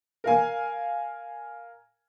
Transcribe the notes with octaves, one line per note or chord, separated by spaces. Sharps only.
A#4 F5 G#5